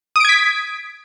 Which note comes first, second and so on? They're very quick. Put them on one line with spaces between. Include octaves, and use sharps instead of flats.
D#6 D7 G#6 B6